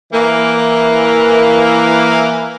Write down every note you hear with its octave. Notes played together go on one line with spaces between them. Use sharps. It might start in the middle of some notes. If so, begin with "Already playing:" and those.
E3 A#3